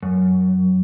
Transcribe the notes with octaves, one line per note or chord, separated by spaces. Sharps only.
F#2